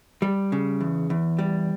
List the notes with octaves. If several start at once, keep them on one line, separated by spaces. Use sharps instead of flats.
G3
C#3
E2
E2
G3